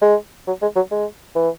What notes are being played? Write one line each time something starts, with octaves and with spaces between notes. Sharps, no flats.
G#3
F#3
G#3
F#3
G#3
E3